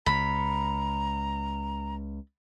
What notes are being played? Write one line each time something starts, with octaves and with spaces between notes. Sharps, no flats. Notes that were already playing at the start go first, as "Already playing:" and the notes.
C#2 A#5 B5